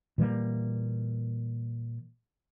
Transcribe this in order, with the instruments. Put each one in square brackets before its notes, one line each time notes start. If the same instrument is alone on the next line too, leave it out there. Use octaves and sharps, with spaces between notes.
[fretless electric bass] A#2 E3 G3 A#3